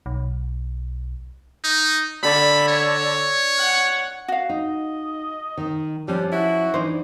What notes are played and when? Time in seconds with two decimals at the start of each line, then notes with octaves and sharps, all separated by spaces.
0.06 B1
1.64 D#4
2.23 D3 B5
2.68 C#5
3.58 F#5
4.28 F#4 F5
4.49 D#4 D#5
5.57 D#3 D#4
6.08 F3 G3 C#4 D4
6.32 E4 F#4
6.74 E3 D4 D#4 C5